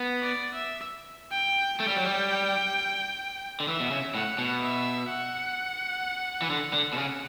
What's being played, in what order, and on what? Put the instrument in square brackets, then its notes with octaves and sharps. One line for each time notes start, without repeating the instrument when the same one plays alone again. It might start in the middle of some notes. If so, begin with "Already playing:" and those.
Already playing: [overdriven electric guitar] B3
[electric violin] D5
E5
G5
[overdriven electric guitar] A3 [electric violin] G5
[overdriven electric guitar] G3
F#3
G3
D3
[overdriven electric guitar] E3 [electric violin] E5
[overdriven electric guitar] B2
C#3
[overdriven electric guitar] A2 [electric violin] F#5
[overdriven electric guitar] B2
[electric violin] E5
F#5
[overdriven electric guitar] E3
D3
D3
B2
C#3